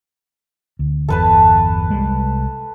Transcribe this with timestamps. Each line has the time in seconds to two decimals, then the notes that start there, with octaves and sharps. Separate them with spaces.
0.79 D2
1.09 G1 E2 A4 B4 A5
1.90 C2 G3 G#3